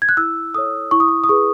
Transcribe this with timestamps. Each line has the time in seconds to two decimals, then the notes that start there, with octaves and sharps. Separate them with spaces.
0.02 G#6
0.09 F#6
0.17 E4 E6
0.54 A4 C#5 D#6
0.91 E4 C#6
1.00 D#6
1.08 C#6
1.24 D#6
1.29 G#4 B4 C#6